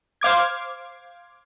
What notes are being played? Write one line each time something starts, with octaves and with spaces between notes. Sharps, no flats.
C5 F5 D6 G#6